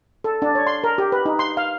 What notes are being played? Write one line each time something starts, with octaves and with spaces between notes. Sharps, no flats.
A4
D4
C#5
C6
A#4
G4
B4
D#4
C6
F5